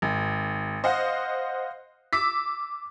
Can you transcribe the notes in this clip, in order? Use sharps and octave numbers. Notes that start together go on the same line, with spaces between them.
G#1
C5 D#5 F5 F#5
D6 E6 B6